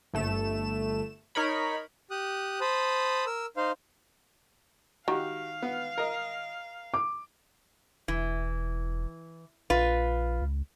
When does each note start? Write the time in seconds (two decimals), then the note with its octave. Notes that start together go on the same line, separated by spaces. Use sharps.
0.13 G1 A3 E7
1.35 D#4 A#4 C#5 B5
2.11 G4 D#6 F#6
2.61 C5 A5 B5 D#6
3.26 A#4 E6
3.57 D#4 C5 F5
5.08 D#3 F#4 G4 F5
5.62 B3
5.98 A#4 D#5
6.94 D6
8.08 E1 E3
9.70 A#1 F4 B4
10.42 C#2